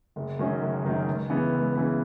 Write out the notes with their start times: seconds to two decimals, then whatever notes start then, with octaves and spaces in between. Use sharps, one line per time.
0.16 F#1
0.39 F#2 D#3 F#3 C#4
0.62 F#1
0.84 F#2 D#3 F#3 C#4
1.07 C#2
1.30 C#3 E3 B3
1.53 C#2
1.75 C#3 E3 B3